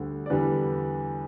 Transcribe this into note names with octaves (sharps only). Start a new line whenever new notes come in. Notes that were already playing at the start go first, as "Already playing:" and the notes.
Already playing: D2 D3 G3
D5
E2 D3 G3 B4